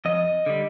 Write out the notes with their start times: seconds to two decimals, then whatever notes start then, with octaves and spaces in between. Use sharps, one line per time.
0.05 F2 D#5
0.46 D3 G3